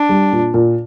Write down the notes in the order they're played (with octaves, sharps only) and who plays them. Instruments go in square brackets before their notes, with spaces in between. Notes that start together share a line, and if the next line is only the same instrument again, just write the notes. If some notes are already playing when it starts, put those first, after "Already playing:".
Already playing: [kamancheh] D4
[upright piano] G3
A#2
A#2